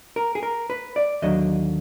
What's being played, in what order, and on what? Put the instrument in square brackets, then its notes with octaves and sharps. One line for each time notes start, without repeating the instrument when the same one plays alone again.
[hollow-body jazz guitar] A#4
G#4
A#4
B4
D5
D#2 D3 F#3 D#5